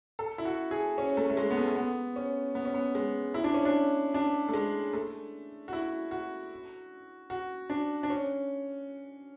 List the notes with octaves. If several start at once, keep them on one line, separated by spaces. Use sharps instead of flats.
A4
E4
F#4
G#4
C#4
A3
A3
G#3
B3
A3
A3
B3
C#4
B3
C#4
B3
G#3
E4
D4
C#4
D4
D4
A3
G#3
A3
F#4
E4
F#4
F#4
D4
D4
C#4